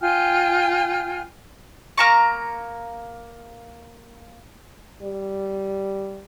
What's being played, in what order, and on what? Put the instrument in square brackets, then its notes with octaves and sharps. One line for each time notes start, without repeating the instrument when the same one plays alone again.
[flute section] F4 G5 G#5 F6
[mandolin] A#3 A#5 C#6
[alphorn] G3